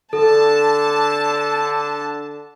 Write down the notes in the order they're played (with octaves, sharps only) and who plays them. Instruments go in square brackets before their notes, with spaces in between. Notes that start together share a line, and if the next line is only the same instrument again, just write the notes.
[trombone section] D3 [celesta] A4 [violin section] A5